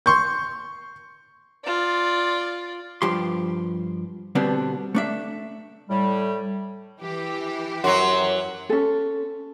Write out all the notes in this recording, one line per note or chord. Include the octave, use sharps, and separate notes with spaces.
C6 C#6 G6
F4 D5
G2 F3 G4 C6
B2 D3 G3 B3 C4 D4
A3 D4 E5
A2 G3
E3 G4
F#2 F#3 F#4 C6
C#4 A4